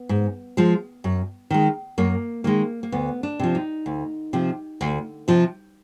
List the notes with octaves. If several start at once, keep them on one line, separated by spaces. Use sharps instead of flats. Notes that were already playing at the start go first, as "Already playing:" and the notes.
Already playing: B3
G#2
F3 G#3
F#2
D#3 G#3
F#2 A#3
D#3 G#3 A#3
A#3
D2 B3
D4
C3 F3
D#4
D2
C3 F3
D2
C3 F3